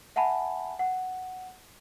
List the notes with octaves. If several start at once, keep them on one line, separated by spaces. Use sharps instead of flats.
E5 F#5 G#5 A5 B5
F#5